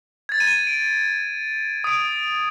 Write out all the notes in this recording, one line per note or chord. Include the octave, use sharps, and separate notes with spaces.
G#6 A6
D#7
D7
D#6 D7